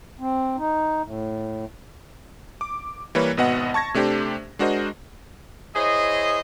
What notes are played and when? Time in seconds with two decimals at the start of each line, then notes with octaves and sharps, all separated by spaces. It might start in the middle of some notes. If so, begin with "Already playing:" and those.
0.20 C4
0.58 D#4
1.04 A2
2.61 D6
3.15 E3 G3 A#3 B4 C#5
3.37 G#1 B2 B3 D#5 F#5
3.74 A5 C#6 G#6 A#6
3.94 C3 A3 D4 G4 C5
4.59 G#3 D4 F#4 A#4 C5 D#5
5.75 E4 G#4 C5 C#5 D#5